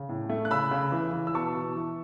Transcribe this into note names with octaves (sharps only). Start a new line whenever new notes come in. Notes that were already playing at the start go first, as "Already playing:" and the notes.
Already playing: C#3
A2
A3
F#6
C#3 B5 E6
C#3
E3
E3
E6
B2 A5 C#6
B2
E3